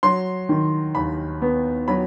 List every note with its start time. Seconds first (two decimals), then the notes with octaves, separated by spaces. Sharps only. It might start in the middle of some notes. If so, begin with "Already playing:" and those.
0.03 F#3 C6
0.49 D#3
0.95 D#2 B5
1.42 B3
1.88 F#3 B5